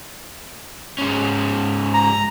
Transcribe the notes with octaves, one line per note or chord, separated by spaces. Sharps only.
G#2 C#4
A#5